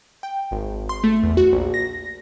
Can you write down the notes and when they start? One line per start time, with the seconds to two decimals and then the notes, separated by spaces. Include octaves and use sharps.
0.23 G5
0.51 G#1
0.89 C6
1.04 A3
1.23 E2
1.37 F#4
1.53 A#1
1.74 A#6